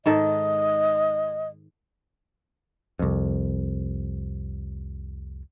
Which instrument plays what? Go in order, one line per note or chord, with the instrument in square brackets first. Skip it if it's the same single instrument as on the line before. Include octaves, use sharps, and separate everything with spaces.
[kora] G#2 D#3 A4 [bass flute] D#5
[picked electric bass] C2 F2